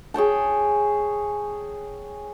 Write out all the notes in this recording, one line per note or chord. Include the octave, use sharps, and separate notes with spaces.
G#4 C#5 G5 A5